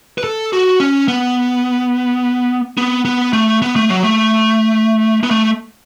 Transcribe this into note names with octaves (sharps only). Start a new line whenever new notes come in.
B4
A4
F#4
C#4
B3
B3
B3
A3
B3
A3
F#3
A3
B3
A3